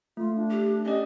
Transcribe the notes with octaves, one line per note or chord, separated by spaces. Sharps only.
A3 F4
D4
G4
C#4 G4 D5 D#5 D#6